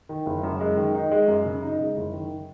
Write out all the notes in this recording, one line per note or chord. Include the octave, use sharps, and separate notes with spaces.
D#3
F#1
F#2
G#3
D#3
D#4
G#3
F#2
C#3
D#4
G#3
F#1
D#3